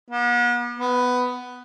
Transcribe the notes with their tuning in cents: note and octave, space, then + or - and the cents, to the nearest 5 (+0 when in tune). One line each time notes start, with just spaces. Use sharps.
B3 -40
B3 +10